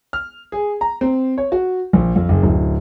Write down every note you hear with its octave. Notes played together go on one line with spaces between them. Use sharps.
F6
G#4
A#5
C4
C#5
F#4
A#1
F2
F#1
D1